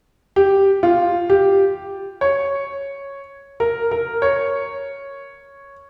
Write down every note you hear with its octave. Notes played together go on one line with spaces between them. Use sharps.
G4
F4
G4
C#5
A#4
A#4
C#5